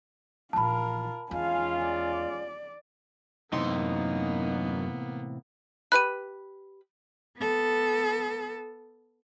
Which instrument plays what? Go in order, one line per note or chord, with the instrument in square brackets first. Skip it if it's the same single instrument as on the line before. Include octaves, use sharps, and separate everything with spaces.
[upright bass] A#1 E3 [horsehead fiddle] F4 A#4 [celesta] A5 B5
[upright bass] E2 [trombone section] G#3 C#4 F4 [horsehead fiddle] F5 G#5
[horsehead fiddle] D5
[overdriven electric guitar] F#2 C6 [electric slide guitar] A2 C3 E3 [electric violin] A#3 B3 [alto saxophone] D#4
[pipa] G4 B4 B5 [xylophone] F#6 D#7
[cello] B3 A4